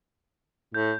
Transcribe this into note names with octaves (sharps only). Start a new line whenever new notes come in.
A2 G6